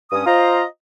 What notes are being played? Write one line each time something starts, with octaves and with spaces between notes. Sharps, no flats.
G2 C#4 D#6
F4 C5 D#5 A#5